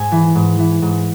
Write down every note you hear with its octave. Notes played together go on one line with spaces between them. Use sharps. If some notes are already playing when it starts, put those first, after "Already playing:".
Already playing: G#2 G#5
E3
G#2
E3
G#2